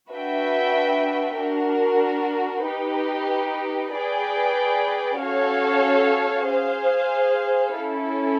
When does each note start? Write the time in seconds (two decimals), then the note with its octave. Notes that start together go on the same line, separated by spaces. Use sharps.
0.11 D4 F#4 B4 E5 G5
1.37 D4 F#4 A#4
2.65 D#4 G4 B4
3.93 G#4 B4 D5 G5
5.21 C#4 F#4 A4 C#5 F5
6.49 G#4 C5 F5
7.76 C#4 E4 A4